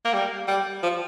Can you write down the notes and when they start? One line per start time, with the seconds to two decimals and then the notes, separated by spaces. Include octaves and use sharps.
0.05 A#3
0.13 G3
0.48 G3
0.83 F3